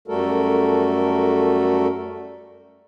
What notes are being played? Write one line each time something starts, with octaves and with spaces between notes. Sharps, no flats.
F#2 G3 A3 F#4 A4 A#4